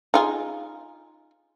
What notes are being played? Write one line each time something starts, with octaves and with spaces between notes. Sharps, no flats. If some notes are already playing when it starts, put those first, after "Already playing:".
D#4 F4 G#4